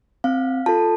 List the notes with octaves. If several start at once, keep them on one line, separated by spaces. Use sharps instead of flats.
C4 F5
F4 A4 A5